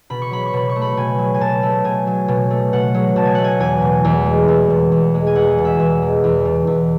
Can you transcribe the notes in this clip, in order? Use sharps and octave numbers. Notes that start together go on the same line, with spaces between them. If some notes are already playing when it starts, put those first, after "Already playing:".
B2 B5
C#6
F#3 B5
C#6
B2 B5
C#6
A3
B5
B2 G#5
F#3
G#5
B2 A5
A3
B2 G#5
F#3
B2
A3
B2 F#5
F#3
B2 A5
G#5
A3 F#5
G#5
E2 G#5
B2
E2
G#3
E2
B2
E2
G#3
G#5
E2 F#5
B2
E5
E2
G#3
E2
B2
E2